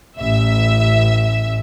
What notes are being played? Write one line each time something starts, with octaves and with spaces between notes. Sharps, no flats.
A1 E5